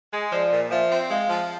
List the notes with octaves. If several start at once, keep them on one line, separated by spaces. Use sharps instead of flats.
G#3
F3 D5
A#2
F3 E5
C4
G#3 F5
F3